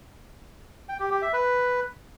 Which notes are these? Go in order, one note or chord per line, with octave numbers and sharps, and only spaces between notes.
G5
G4
G4
E5
B4